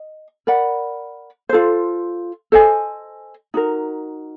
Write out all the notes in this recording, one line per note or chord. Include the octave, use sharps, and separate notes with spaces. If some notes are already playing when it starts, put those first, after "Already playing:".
Already playing: D#5
A#4 D5 F#5 B5
F4 A4 C5
A4 C5 D#5 G#5
D#4 F#4 A#4